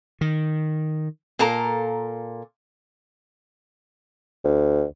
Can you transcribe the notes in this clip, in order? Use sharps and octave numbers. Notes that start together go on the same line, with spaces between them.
D#3
A#2 F4 A4 A#4 A#5
D2